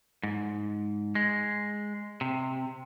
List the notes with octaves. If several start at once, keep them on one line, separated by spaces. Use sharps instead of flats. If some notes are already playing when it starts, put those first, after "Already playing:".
G#2
G#3
C3